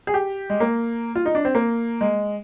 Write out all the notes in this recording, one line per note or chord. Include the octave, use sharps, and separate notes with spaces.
G#4
G4
G#3
A#3
F4
D#4
D4
C4
A#3
G#3